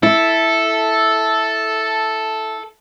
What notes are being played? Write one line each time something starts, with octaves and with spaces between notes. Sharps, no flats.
E4 A4